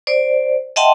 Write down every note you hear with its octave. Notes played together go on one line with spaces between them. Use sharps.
C5 D5
D#5 E5 F#5 G5 A5 C6